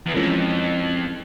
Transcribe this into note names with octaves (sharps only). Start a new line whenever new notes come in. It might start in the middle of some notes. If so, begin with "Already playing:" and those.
E2
F2 E3 G#3 C#4 F4 A#4